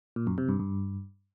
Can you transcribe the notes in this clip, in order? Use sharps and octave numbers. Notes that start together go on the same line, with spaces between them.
A#2
F#2
C3
G2
G2